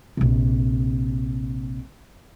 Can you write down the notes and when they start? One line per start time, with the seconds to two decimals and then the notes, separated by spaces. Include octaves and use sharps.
0.17 A#1 C3